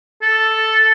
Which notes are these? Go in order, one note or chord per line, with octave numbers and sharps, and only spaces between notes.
A4